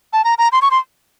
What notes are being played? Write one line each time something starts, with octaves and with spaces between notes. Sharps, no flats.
A5
A#5
A#5
C6
C#6
C6